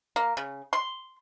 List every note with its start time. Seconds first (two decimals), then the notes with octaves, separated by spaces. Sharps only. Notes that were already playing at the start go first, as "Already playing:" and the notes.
0.16 A#3
0.37 C#3
0.73 C6